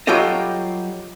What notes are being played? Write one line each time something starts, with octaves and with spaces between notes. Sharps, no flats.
F#3 G3 F4 G4 A4 D#5